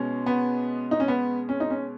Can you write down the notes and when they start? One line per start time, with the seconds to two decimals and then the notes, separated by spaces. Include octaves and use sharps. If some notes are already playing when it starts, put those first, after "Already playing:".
Already playing: B2 G#3 C#4
0.26 B3
0.91 D#4
1.00 C#4
1.08 B3
1.49 C#4
1.60 D#4
1.70 C#4